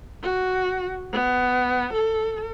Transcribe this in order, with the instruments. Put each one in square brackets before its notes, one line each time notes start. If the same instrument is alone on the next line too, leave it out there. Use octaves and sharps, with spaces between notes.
[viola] F#4
B3
A4